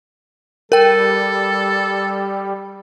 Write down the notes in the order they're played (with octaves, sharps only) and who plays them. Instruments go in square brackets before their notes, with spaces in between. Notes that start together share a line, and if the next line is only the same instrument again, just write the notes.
[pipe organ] G3 [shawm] A4 [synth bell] A#4 G5